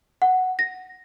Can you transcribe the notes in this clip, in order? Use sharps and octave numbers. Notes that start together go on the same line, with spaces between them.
F#5
A#6